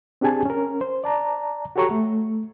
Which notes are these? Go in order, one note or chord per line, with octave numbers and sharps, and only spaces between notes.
C4 D4 G4 G#4 G#5 A5
C#4 A#4
C5
D5 A5 A#5
F#4 G4 A4 C#5 A#5 C#6
A3